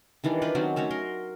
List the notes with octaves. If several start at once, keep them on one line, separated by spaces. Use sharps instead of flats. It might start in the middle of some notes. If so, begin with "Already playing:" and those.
D#3 E3 G3 D4
F4 G4 B4 D5
D#3 F#3 C4 C#4
A3 C#4 F#4 C#5
A#4 C6